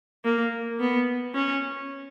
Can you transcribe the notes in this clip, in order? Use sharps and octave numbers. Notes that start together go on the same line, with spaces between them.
A#3
B3
C#4